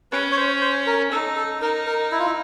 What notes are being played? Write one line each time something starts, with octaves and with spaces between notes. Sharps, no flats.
C#4 B4
C#5
C5
C5
A#4
D#4 A4
A4
D#4 A#4
A#4
E4
F4
E4